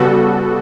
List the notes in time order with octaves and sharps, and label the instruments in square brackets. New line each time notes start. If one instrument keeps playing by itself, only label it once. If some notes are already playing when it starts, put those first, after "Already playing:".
Already playing: [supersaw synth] C#3 G3 B3 F#4 A4